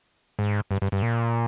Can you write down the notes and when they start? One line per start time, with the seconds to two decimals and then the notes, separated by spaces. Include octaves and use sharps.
0.39 G#2
0.71 G2
0.82 G2
0.92 G2
1.02 A#2